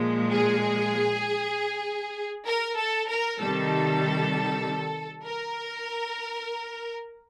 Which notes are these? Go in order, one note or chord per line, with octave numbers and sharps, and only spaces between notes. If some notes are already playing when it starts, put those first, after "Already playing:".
Already playing: A#2 F3 G#3
G#4
A#4
A4
A#4
C3 D#3 G3 A4
A#4